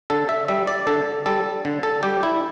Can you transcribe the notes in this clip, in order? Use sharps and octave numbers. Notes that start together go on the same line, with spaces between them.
D3 A4
E5
G3 E5
D5
D3 A4
G3 A4
D3
A4
G3 G4
E4